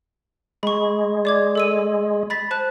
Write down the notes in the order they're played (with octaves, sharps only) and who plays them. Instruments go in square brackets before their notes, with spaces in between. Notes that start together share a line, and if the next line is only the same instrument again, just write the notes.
[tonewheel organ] G#3 [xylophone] B5 C#6
[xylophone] D5 D6 G#6
A4 E6 D#7
B5 A6 B6
C5 A5 F#6